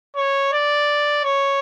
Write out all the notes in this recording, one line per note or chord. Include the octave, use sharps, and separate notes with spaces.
C#5
D5
C#5